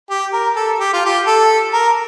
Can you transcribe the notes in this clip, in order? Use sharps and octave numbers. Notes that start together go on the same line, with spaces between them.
G4
A#4
A4
G4
F4
G4
A4
A#4